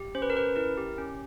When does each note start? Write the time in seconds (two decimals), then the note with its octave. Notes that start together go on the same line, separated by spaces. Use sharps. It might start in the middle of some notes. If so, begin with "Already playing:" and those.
Already playing: G4
0.15 C#4 C5
0.22 B4
0.30 A#4
0.36 C#4 B4
0.56 E4 A#4
0.77 G4
0.98 C#4